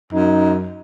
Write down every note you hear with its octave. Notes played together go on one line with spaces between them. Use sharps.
F#2 D#4